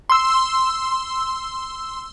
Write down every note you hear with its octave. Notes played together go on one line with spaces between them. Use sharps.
C6 E6